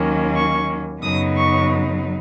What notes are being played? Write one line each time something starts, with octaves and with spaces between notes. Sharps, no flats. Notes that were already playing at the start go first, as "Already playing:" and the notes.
Already playing: D#2 D#3 F#3 A#3 C#4
C#6
F#2 C#3 F#3 B3 D#4 D#6
C#6